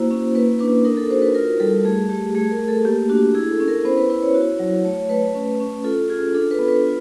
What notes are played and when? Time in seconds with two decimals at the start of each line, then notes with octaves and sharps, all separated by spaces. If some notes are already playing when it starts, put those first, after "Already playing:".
Already playing: A#3 E4 F#4 C5
0.11 C#4
0.35 A#3 B4
0.59 D4 B4
0.84 D#4 A#4
0.97 A4
1.10 F#4 C5
1.22 B4
1.35 F4 A#4
1.60 G3 A4
1.85 A3 G#4
2.09 A3 G4
2.35 A3 G#4
2.51 A#4
2.60 A3
2.68 A4
2.85 A#3 G4
3.10 D4 F#4
3.35 E4 G#4
3.51 A4
3.60 C#4
3.68 A#4
3.85 B3 C5
3.97 B4
4.09 E4 B4
4.22 C#5
4.34 F#4
4.59 F#3
4.84 A3 C#5
5.09 A3 B4
5.34 C#4
5.60 C#4
5.84 F4 A4
6.09 F4 G#4
6.34 D4 A4
6.51 B4
6.59 B3
6.68 B4
6.84 F4